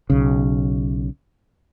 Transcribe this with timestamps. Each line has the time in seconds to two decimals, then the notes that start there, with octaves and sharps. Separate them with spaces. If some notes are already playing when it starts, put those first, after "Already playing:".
0.10 B1 C#3